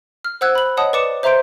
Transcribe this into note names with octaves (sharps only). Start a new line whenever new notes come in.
F6
C5 F#5 E6 F#6 G#6
B5 F#7
C#5 D#5 F#5 A5 D#6
B4 D5 D6 C#7 E7
C5 E5 A#5 C6 G6 D7